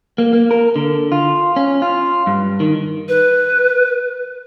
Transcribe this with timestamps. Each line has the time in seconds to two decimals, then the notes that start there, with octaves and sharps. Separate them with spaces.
0.18 A#3
0.33 A#3
0.51 A#4
0.76 D3
1.12 F4
1.56 C#4
1.82 F4
2.27 G2
2.60 D#3
3.08 B4